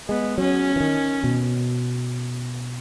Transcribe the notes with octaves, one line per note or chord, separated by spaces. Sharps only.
G#3 B3
F#3 C#4
E3
D#3
B2